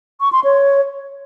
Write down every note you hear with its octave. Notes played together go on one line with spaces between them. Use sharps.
C#6
C6
C#5